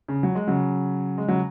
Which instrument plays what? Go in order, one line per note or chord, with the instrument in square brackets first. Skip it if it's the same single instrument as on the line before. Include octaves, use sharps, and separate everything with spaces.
[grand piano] C#3
F#3
G#3
C#3 F#3
G#3
C#3 F#3